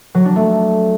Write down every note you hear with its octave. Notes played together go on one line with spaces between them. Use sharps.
F#3
D4
A3